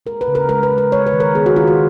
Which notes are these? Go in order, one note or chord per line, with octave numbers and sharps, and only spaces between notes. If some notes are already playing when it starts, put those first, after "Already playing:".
G#3 A#4
B4
C#3
A#4
G#3 A#4
B4
C#3
B4
G#3 C#5
B4
D#3
A#4
B3 G#4
F#4
D#3 F4
F#4